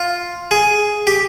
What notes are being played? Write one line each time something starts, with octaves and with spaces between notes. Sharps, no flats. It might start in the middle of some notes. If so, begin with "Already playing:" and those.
Already playing: F4
G#4
G4